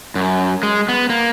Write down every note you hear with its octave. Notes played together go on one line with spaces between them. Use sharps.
F#2
G#3
B3
A#3